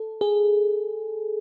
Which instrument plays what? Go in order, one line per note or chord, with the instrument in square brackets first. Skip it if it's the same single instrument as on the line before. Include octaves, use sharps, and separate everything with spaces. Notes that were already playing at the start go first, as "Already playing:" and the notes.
Already playing: [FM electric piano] A4
G#4